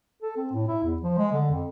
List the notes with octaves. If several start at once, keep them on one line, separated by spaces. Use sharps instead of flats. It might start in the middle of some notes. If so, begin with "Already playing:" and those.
A4
C4
A2
E4
E2
F3
G#3
D3
F2